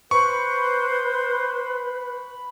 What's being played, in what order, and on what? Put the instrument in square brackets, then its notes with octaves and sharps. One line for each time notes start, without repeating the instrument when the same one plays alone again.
[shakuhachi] B4 [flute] C5 [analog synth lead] B5 [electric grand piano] C#6